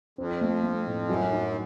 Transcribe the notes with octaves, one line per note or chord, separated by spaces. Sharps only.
F2 C4
A3
A3
A2
F#2 F#3
D#4